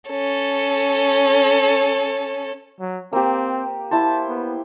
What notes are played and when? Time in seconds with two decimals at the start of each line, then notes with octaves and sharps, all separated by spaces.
0.10 C#4 A4
2.80 F#3
3.13 A#3 C4 G4
3.91 E4 C5 A5
4.28 B3